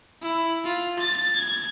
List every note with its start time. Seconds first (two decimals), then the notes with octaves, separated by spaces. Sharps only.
0.22 E4
0.64 F4
0.99 A6
1.37 G#6